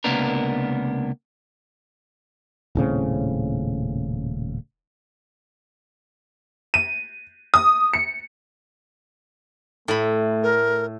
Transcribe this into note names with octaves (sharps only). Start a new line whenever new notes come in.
C#2 C3 A#3 B3 D4 A#4
D#1 A2 C#3 C4
D#7
D#6
C#7
A2 A3 B5
A#4